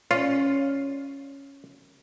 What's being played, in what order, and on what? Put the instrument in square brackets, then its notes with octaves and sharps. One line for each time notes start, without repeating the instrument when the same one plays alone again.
[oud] C#4 [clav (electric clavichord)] F4